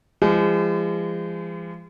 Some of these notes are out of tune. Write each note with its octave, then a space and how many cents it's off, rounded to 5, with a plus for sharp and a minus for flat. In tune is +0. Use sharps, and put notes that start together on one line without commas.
F3 -40 G#3 -35